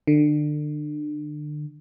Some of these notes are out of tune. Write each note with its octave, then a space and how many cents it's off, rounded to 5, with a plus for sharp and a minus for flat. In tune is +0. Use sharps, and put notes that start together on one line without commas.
D3 +30